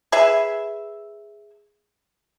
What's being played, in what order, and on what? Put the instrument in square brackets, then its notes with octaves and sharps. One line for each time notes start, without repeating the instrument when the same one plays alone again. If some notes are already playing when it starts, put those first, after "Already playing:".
[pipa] G#4 B4 E5